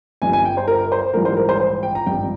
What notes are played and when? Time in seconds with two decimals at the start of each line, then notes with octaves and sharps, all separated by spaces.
0.22 G1 G2 G3 G#5
0.33 G#5
0.45 G5
0.57 C5
0.68 A#4
0.92 C5
1.14 A#1 G#2 E3 G3 A#4
1.25 C5
1.37 A#4
1.49 C5
1.60 C5
1.83 G5
1.95 A#5
2.06 G#1 G2 F3 G5